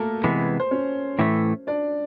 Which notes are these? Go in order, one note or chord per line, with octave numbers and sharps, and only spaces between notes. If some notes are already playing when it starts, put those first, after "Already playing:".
Already playing: A3 A#3 A4 A#4
C3 E3 G#3 B3
C5
C#4 C#5
A2 E3 A3
D4 D5